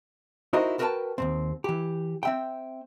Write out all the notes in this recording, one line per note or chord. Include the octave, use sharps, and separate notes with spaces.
D#4 E4 F#4 A#4 C5 D#5
F#4 A#4 B4 E5 G5 A5
D#2 G#2 C4
E3 G4
C4 E5 G5